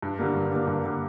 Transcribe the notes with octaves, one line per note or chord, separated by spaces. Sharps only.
G2
D3 G3 A#3
G2
D3 G3 A#3
G2
D3 G3 A#3